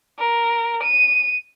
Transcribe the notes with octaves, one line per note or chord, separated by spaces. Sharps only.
A#4
D#7